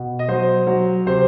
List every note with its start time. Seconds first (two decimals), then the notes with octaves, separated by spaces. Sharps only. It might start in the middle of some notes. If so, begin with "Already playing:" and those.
Already playing: B2
0.19 D#5
0.28 F#3 C5
0.67 F#3
1.06 C3 C5